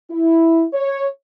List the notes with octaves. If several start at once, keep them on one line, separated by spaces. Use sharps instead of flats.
E4
C#5